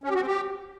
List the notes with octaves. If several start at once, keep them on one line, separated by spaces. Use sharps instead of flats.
C#4
G4
F#4
C4
G4